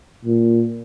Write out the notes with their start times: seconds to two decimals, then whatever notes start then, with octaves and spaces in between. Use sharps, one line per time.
0.25 A#2